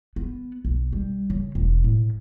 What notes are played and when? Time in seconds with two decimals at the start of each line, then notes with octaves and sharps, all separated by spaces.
0.16 B3
0.65 B1
0.93 G3
1.30 C#3
1.55 E1
1.84 A2